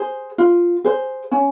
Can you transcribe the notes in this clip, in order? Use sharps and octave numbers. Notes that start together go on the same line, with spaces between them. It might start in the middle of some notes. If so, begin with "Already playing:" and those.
Already playing: G#4 C5
F4
G#4 C5
C#4